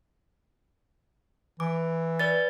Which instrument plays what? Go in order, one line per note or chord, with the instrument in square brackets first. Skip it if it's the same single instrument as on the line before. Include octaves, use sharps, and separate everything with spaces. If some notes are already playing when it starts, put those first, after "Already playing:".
[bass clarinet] E3 [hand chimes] D6
[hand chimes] B4 D5 A6